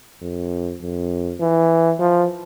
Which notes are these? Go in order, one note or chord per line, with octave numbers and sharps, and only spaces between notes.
F2
F2
E3
F3